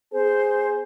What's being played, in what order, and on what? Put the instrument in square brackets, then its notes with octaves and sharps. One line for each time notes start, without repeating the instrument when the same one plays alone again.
[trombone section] B3 G#4 [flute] C5